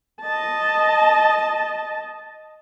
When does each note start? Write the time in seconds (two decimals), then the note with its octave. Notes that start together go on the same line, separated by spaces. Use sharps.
0.22 D#5 A5